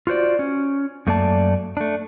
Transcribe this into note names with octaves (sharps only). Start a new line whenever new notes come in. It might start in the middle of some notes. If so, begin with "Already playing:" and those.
F4 F#4 C5 D5
C#4
F#2 A3 A#3 D5 A5
A3 D4